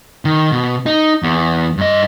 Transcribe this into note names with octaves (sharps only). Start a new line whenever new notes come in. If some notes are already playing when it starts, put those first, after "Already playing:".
D#3
B2
D#4
E2
G2 D#5